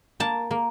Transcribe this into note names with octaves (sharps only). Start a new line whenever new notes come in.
A#3 A5
A#3